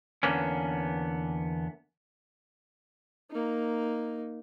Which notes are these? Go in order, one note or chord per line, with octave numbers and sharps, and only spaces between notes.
E2 D3 A#3 B3 C#4
A#3 D#4